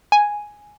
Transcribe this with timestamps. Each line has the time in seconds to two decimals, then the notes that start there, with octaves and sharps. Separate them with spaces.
0.12 G#5